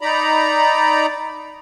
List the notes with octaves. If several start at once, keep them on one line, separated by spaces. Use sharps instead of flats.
D#4 D5 A#5 B5